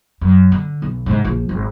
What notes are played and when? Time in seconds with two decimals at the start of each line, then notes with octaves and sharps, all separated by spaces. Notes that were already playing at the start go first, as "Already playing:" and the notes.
0.21 F#2
0.52 D3
0.82 B1
1.06 G#2 C3
1.24 A#1 F3
1.49 G#1